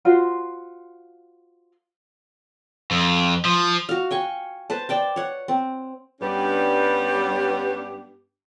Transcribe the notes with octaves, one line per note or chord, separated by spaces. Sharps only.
F4 F#4 C5
F2
F3
F#4 F5
G5 G#5 C#6
B4 C5 A5
D5 G5 A5
C#5 F#5
C4
G2 G3 B3 C#4 D4 G4